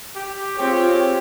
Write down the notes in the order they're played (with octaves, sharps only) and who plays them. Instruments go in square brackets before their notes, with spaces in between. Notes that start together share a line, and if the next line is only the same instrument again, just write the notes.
[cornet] G4
[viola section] C4 F4 G#4 C#5 [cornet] G4